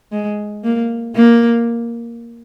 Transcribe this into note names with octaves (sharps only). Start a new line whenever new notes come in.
G#3
A#3
A#3